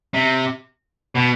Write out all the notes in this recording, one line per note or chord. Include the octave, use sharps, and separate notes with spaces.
C3
B2